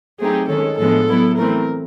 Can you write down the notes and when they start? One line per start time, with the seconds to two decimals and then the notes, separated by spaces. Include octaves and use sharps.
0.19 F#3 A3 C4 D#4 G4 G#4
0.49 D#3 G#3 C#4 A4
0.78 A2 F3 G#3 B3 D4 A4
1.08 F#3 B3 E4
1.38 E3 A3 C4 A#4